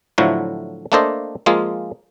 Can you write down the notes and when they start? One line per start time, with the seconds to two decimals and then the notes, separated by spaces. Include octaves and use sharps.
0.18 A2 D3 F3 F#3 E4 F#4
0.92 A3 A#3 D4 A4 C5 D#5
1.46 F3 G#3 A#3 F4 G#4